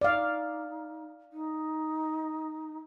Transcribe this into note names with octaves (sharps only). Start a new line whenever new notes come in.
D#4 D5 F5
D#4